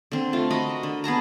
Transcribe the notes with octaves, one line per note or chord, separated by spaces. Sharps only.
D3 C4
A3 F4
F#4 A#4 D#5 B5
D3
B3 G#4 A5 A#5